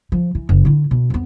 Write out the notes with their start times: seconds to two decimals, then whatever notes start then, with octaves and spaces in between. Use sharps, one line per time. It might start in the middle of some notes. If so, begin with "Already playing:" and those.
0.12 F3
0.35 E3
0.49 F#1
0.65 D3 E4
0.91 B2
1.10 F2 B3